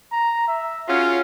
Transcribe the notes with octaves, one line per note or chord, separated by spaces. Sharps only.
A#5
E5
C#3 C#4 F4 F#4